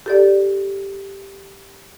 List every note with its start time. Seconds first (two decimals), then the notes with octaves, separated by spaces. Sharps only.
0.06 G4 A4 D5